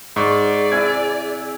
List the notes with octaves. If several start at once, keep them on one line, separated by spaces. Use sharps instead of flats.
G#2 G#4 D5 C#6
C3 E4 G#5 G#6